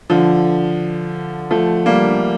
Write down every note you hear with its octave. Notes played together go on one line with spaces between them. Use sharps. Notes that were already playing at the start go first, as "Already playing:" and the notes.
D3 F3
F3 A3
G3 A#3